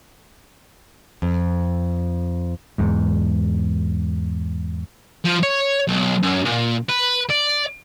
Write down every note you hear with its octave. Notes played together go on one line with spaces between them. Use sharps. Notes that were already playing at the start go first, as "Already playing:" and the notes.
F2
E2 G#2
F3
C#5
B1
F#2
A#2
B4
D5